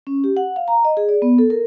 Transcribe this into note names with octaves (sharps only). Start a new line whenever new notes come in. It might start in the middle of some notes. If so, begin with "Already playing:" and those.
C#4
G4
F#5
F5
A#5
D#5
G#4
D5
B3
A4
A#4